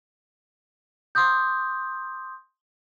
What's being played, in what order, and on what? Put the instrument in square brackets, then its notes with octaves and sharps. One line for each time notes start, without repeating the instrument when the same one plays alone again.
[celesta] C6 D6 D#6 G6